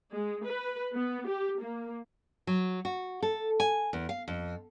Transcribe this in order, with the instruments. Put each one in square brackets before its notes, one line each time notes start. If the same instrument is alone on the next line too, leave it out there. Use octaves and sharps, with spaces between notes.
[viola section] G#3
B4
B3
G4
A#3
[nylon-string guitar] F#3
F#4
A4
G#5
E2
F5
F2